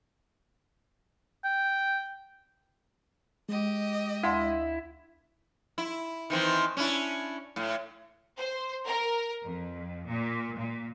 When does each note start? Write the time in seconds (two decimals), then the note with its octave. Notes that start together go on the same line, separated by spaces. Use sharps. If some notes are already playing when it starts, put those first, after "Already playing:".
1.44 G5
3.49 G#3 G4 D#5
4.23 D2 E4 F5 C6
5.78 E4
6.30 D#3 E3 C4
6.77 C#4 D4 E4
7.56 A2
8.37 C5
8.86 A#4
9.43 F2
10.07 A#2
10.57 A#2